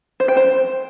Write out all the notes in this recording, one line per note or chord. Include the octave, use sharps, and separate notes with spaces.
C5
G5
C5